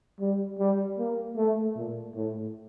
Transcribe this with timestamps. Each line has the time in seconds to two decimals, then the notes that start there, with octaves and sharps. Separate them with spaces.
0.20 G3
0.59 G3
0.98 A#3
1.36 A3
1.76 A#2
2.15 A2